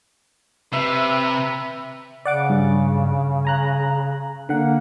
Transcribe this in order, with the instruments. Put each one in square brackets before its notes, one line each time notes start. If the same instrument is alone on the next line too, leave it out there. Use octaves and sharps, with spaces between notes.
[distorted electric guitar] C3 [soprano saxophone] B4 [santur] E5
[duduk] C#3 [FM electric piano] D5 F#5 D6
[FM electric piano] G2
G#5 A#5 F#6
[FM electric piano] D3 F#5 [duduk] A#3